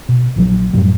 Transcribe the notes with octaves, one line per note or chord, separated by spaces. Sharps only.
B2
A#1 A#2 E3 F#3
F#2 A2 F#3 G3